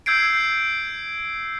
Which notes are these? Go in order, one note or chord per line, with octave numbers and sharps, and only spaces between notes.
E6 G6 G#6 C7 D7